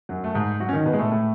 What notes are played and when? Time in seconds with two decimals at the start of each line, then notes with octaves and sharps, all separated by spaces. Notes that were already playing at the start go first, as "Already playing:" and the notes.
0.09 F#2 F#3
0.24 A3
0.34 G#2 G#3
0.60 F#3 F#4
0.69 C#4
0.73 D#3 D#4
0.86 B2 B3
0.93 G#3
0.99 A2 A3
1.11 A2 A3